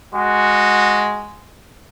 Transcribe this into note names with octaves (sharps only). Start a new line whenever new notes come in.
G#3 F#4